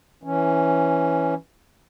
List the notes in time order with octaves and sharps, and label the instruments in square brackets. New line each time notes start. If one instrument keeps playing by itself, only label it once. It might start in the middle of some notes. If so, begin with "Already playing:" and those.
[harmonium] E3 C#4